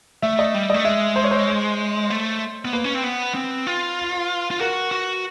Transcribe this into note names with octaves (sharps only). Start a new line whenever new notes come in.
A3 E5
D#5
G3
A3 D#5
G#3 E5
C5
C#5
C5
A3
B3
A#3 B4
C#4
C4
B3
C4
F4
F4
F#4 A#4
F#4